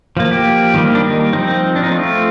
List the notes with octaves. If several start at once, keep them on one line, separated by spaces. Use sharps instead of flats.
F3 A#3
G4
D#3 G3 A#3
D4
D#4
F3 C4 D#4
D4
D#4
F3 A3 C4 F4